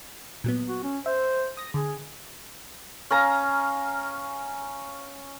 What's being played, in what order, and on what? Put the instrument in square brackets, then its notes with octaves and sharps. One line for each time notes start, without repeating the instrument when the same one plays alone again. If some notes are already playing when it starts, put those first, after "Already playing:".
[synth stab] A#2 F#3 B3
[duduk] F#4
C#4
[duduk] C5 [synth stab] E5
[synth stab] D#6 A#6
[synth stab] D3 [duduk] G#4
[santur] C#4 F5 A#5